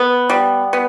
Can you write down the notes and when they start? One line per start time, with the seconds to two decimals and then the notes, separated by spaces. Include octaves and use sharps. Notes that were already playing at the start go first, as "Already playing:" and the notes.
Already playing: B3
0.30 G3
0.73 B3